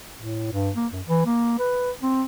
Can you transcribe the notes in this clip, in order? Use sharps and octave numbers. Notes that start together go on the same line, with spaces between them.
A2
G2
A#3
F#2
E3
A#3
B4
C4